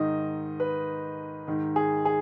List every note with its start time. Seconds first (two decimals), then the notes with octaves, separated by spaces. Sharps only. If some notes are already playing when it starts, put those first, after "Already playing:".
Already playing: G#2 D#3 D#5
0.60 B4
1.47 G#2 D#3
1.76 G#4
2.05 G#4